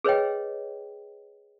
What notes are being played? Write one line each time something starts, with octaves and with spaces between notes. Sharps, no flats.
G#4 B4 C#5 D#5 G5